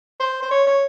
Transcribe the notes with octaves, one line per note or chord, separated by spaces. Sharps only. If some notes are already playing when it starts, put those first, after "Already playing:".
C5
C5
C#5
C#5